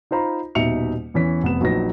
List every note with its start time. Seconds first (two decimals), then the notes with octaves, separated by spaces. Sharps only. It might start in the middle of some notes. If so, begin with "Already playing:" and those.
0.11 D#4 F4 C5 A#5 B5
0.55 D#1 B2 D#4 E5 C#7 F7
1.14 E2 E3 C#4 B6
1.43 F1 B3 E7
1.60 A#1 F#3 D#4 B4 A#6